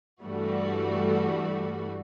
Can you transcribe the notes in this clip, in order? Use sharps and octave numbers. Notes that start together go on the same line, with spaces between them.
G2 E3 G3 A3 F#4